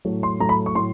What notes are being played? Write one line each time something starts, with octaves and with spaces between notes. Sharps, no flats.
A2 F#3 A3
C6
A2 F#3 A3 A#5
B5
C#6
A2 F#3 C6